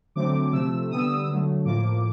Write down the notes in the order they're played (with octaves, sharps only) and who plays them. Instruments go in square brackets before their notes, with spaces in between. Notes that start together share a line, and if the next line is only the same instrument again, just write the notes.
[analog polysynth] D3 F#3 A3 C4 D6
C3 F3 A3 E6
D3 G3 B3 D#6
E6
D#6
D3 F#3 A3
A2 F3 A#3 D6